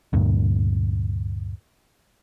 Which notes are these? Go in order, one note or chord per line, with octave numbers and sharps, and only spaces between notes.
D2 G2 A#2